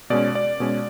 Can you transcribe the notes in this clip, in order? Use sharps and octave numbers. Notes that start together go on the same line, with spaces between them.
B2 G#3 C#4 D5
D5
B2 G#3 C#4